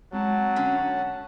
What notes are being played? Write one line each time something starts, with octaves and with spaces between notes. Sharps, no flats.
F#3 G#3 C4 F#5 A5 A#5
D3 C#4